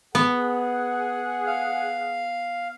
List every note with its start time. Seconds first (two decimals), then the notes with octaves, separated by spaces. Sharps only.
0.15 B3 G#4 F#5
1.46 F5